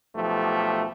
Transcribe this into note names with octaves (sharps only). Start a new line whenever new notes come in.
B1 F3 A3 G4